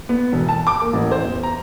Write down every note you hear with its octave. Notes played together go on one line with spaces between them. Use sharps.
B3
E1
A5
D6
A#3
A1
C5
E2
A#5